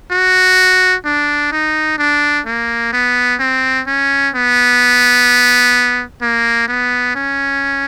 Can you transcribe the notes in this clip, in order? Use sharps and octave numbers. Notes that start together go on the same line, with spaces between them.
F#4
D4
D#4
D4
A#3
B3
C4
C#4
B3
A#3
B3
C#4